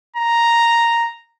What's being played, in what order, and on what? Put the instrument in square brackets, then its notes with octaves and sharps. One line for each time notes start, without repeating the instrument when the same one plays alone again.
[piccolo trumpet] A#5